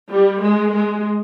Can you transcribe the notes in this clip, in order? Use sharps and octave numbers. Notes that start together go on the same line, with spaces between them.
G3
G#3
G#3